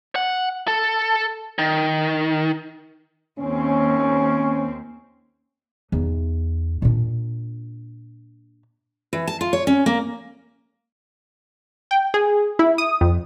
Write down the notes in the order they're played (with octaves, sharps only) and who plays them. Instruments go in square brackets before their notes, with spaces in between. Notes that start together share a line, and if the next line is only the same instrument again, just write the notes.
[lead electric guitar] F#5
A4
D#3
[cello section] D#2 C4 [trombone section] C#4
[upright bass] E2 D#4
A#2 D4
[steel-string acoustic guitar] E3
A5
F4
C#5
C#4
A#3
[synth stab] G5
G#4
E4
D#6
F2